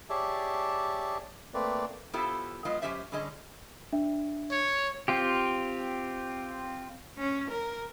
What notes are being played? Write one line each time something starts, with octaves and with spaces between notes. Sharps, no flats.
G4 G#4 C#5 D5 E5 A5
A3 A#3 C4 B4 D5
B3 E4 F4 G4 A4 C5
F#3 G#3 B3 F4 D#5 F5
F#2 G#3 C#4 G4 C5 E5
D3 G3 C#4 G#4 D#5
D4 E5
C#5
C4 F4 G4
C#4
A#4